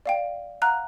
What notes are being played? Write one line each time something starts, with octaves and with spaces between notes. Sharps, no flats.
D5 F5 G5
F5 F#5 A#5 F6 F#6